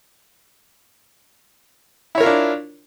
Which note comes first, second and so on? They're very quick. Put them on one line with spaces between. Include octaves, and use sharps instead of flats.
E4 C#5 A#4 F4 D4